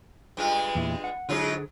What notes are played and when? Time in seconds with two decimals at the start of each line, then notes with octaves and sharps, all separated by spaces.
0.37 G2 G#3 F4
0.75 E2 A#2 E4
1.04 F#5
1.29 G#2 D3 F#3 F4 G#4